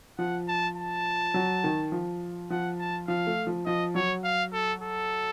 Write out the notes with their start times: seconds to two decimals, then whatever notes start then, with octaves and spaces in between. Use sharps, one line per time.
0.18 F3 F#5
0.48 A5
0.77 A5
1.34 F#3
1.64 D#3
1.92 F3
2.50 F3 F#5
2.79 A5
3.08 F3 F5
3.27 A3
3.47 F3
3.66 F3 D#5
3.95 F#3 C#5
4.24 F5
4.53 A4
4.82 A4